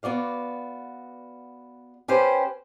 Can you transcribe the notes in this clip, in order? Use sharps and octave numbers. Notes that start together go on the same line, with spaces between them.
B3 F#4 D5 F5
C#4 G4 B4 C5